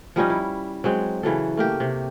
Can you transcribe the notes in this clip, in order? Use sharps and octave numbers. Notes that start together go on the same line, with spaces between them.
F3 G3 C#4 D#4
E4
F#3 G#3 C4
C#3 E3 F#3 A4
A3 A#3 G4
C3